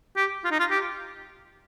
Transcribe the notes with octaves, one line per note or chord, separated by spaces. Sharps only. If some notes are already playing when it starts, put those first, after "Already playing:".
G4
F4
D#4
F4
G4